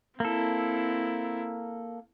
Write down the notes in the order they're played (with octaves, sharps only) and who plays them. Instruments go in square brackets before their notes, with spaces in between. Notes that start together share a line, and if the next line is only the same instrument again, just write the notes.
[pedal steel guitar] A#3 A4 [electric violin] C4 E4